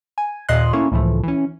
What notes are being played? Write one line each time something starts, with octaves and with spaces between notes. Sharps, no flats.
G#5
D#2 A#2 D#5 C6 F#6
A3 A#3 C#4 E4 C#5
C#2 A2 E3 F3 A3
E3 C#4